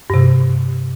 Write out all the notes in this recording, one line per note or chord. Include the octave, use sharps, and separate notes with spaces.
G2 C3